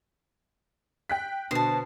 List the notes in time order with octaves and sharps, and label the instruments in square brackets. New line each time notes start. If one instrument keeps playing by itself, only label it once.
[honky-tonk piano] G5 F#6 B6
[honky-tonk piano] B2 D3 [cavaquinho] C5 A5